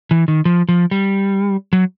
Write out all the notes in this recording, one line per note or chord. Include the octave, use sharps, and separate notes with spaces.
E3
D#3
F3
F3
G3
F#3